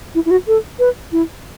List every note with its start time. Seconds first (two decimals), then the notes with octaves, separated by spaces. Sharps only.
0.15 E4
0.26 E4
0.31 F#4
0.47 A4
0.79 B4
1.12 E4